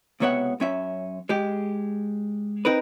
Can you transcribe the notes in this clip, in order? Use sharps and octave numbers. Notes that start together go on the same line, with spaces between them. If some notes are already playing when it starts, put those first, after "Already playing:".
C#2 C3 B3 C#5 E5 F#5
F#2 C#4 E5
G#3 G4
C4 D#4 A#4 B4